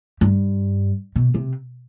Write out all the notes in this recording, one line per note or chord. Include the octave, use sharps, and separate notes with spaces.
G2
B2
C3